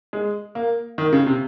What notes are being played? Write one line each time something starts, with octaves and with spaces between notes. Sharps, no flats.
G#3
A#3
D#3
C#3
C3